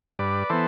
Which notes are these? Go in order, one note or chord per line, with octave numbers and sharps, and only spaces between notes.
G2 B4 D5
E3 B3 A4 C5